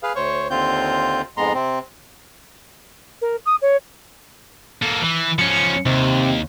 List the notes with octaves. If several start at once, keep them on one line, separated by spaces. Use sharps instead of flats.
G#4 B4 F5
D2 C5 C#5 C#6
D#2 D3 C4 F4 G6
F2 G#2 G#3 B3 A#5 C6
C3 C4
A#4
D#6
C#5
A#3 A4
E3
F3 C#4 C#7
D#2 C3